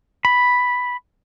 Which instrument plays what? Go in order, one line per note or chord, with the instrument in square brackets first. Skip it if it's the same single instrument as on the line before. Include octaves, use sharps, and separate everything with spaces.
[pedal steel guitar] B5